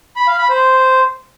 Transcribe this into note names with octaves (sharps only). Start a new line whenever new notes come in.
B5
F5
B5
C5